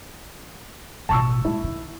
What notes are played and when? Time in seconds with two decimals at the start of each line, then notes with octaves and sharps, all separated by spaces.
1.09 A1 B2 A5 C#6 E6
1.45 G#3 A#3 E4
1.64 D#3